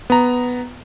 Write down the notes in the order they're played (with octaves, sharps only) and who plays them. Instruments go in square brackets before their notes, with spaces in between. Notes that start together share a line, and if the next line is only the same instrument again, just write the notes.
[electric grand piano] B3 A#5